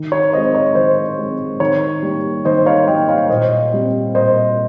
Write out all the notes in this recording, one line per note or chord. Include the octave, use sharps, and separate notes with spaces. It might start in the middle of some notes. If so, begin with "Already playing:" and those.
Already playing: D#3
C#5
G#3 C4 C5 D#5
C#5
D#3 C5
G#3 C4
D#3 C#5
G3 A#3
D#3 C5 D#5
C#5 F5
G3 A#3 D#5 G5
C#5 F5
A#2 C5 D#5
G3 C4
A#2 C5 D#5